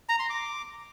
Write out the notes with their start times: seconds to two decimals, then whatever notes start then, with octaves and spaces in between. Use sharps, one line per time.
0.09 A#5
0.19 C6
0.30 D6